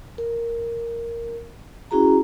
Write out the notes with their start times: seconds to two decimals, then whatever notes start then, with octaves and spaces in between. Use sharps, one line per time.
0.18 A#4
1.91 C#4 E4 F#4 G#4 A#5